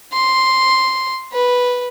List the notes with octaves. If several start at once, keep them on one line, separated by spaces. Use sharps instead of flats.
C6
B4